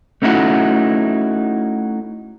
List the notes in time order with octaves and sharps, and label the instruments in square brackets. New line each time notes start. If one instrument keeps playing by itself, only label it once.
[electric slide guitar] A3 C#4 D#4 E4 F#4